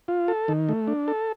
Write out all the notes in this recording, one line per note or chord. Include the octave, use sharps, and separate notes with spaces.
F4
A4
D#3
A3
D4
A4